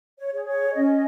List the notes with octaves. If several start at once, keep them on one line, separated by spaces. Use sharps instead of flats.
C#5
G#4 C#5
C#5
C#4 D#5